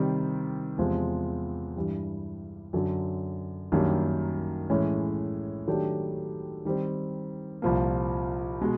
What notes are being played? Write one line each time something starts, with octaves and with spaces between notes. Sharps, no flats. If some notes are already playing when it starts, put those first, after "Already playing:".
Already playing: C3 D#3 G3
E2 C3 F3 G#3
G2 E3 G3
F#2 D3 F#3
F#2 D#3 G3 A#3 D4
A2 E3 G#3 C#4
D#3 F#3 A3 D4 G4
D#3 G3 C4
C2 A#2 F3 A#3
B2 G#3